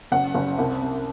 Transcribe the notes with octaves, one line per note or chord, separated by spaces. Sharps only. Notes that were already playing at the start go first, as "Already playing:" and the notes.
F#1 F#5
F#1
C2
C3